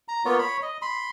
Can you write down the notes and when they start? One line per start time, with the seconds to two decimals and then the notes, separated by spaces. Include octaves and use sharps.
0.08 A#5
0.25 A#3 B3 F4 C#5
0.39 C#5 B5
0.62 D#5
0.82 B5 C6